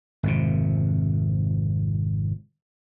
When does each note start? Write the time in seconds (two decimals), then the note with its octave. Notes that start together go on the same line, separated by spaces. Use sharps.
0.23 G#1 F2 C3